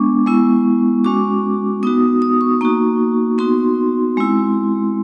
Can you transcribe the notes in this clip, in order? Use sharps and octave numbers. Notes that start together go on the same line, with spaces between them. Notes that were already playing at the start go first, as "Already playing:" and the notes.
Already playing: G#3 B3 D4 C#6
G#3 B3 E4
G#3 C#4 F#4 D6
B3 D#4 F#4 D#6
D#6
C#6
A#3 D#4 F#4 C#6
B3 D#4 F#4 C6
G#3 C4 E4